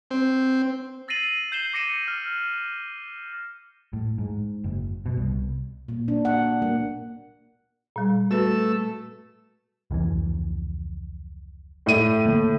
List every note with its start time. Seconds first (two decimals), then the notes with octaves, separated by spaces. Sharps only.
0.11 C4
1.08 E6 A6 A#6 C7 D#7 F#7
1.52 G6 C7 E7 G7
1.73 D6 A#6 C#7 D#7
2.08 F6
3.93 A2
4.18 G#2
4.64 F#1
5.06 B2
5.17 C2
5.88 A#2
6.08 D4
6.25 F#5
6.62 A#3
7.96 A#2 G3
8.31 A3 F#4 B4 E6
9.91 F1 C#2 E3
11.86 A2 D#7
12.26 D3 A#3